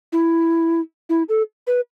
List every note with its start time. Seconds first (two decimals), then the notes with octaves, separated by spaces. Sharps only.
0.12 E4
1.09 E4
1.29 A4
1.67 B4